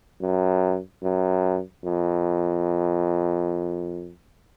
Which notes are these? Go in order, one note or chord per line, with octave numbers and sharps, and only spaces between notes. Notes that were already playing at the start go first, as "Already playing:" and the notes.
F#2
F#2
F2